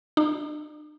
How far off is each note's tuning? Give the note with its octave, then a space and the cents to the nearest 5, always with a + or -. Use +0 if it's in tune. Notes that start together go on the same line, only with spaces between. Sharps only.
D4 +45